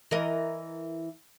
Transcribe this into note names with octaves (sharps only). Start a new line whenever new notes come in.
E3 A#4 D#5